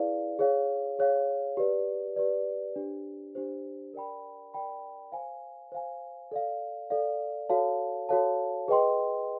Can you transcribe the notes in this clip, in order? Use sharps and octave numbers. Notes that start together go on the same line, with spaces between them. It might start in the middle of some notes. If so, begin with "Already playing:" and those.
Already playing: E4 G#4 B4 D5 F5
G#4 C#5 F5
G#4 C#5 F5
G4 B4 D5
G4 B4 D5
D4 G4 C5
D4 G4 C5
A#4 D5 G5 B5
A#4 D5 G5 B5
C5 F5 G#5
C5 F5 G#5
A4 D5 F5
A4 D5 F5
F#4 A4 C#5 F5 A5
F#4 A4 C#5 F5 A5
G#4 B4 D#5 G5 C6